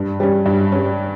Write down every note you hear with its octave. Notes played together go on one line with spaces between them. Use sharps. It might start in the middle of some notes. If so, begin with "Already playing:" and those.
Already playing: G2
G3 C#4
G2
G3 C#4